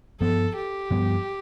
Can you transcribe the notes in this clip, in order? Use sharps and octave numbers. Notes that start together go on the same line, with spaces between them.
G2 F3 B3 A4
G4
G2 F3 B3